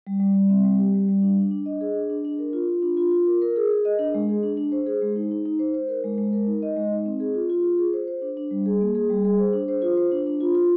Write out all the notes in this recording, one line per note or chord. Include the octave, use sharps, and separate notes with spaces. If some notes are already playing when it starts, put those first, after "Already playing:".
G3
G3
G3
C4
G3
G4
G3
G3
D4
D4
D4
D#5
G#4
D4
D4
D4
A#4
F4
F4
D4
F4
F4
A#4
A#4
G#4
G#4
D#5
D4
G#3
G#4
D4
D4
C5
G#4
G#3
D#4
D#4
D#4
C5
C5
A#4
G#3
G#3
A#4
D#4
D#5
G#3
D#4
C4
G#4
F4
F4
F4
G#4
C5
C5
D4
D4
G3
G#4
A#3
G#4
G3
G#4
C5
D4
C5
F4
C5
D4
D4
F4
F4